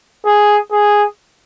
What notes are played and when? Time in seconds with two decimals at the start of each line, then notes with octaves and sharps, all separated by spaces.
0.25 G#4
0.72 G#4